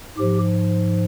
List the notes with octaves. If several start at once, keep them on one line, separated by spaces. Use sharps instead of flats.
G#2 F3 G4